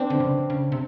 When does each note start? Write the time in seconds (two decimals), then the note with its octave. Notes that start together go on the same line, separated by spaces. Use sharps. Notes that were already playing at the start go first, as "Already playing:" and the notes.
Already playing: C4 D4
0.10 D3
0.20 C#3
0.50 C#3
0.72 C3